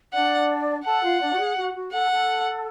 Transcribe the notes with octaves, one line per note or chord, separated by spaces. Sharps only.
D4 D5 F#5
A4 F#5 A5
F4 F5
D4 D5
F#4
G#4
F#4
F#4
A4 F#5
A4